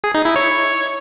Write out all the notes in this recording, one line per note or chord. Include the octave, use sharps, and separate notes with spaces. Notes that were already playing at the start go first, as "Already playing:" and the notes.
G#4
D#4
E4
C#5